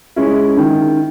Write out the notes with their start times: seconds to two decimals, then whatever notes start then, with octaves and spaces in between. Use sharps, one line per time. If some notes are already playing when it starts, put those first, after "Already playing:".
0.16 G#3 C#4 E4
0.57 D#3